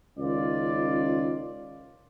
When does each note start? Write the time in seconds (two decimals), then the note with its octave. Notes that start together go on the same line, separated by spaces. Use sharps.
0.18 C#2 D#3 C#4 F4 D5